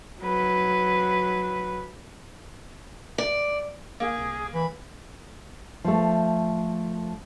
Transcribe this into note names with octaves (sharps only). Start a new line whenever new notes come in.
F#3 B4
D5
A#3 G#4
C2
E3 B5
F3 A3